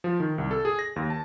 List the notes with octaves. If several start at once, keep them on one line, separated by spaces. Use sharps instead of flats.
F3
D#3
C2
A4
G#4
A#6
D#2
A5